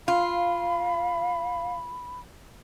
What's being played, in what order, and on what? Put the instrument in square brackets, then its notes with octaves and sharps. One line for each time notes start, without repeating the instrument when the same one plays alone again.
[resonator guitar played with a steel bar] F4 [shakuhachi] F5 [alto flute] B5